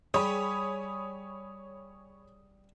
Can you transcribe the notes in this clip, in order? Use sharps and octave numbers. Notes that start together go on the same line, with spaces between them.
G3 G#4 C#5 B5 D#6